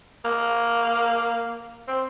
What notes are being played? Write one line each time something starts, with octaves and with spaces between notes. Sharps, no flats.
A#3
C4